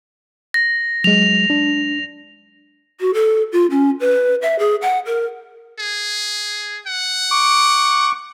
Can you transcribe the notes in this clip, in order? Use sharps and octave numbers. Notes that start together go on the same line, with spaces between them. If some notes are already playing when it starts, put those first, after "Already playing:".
A#6
F#3 G#3 F7
D4
F#4
A4
F4
C#4
B4
E5
G#4
F#5
A#4
G#4
F#5
C#6 D6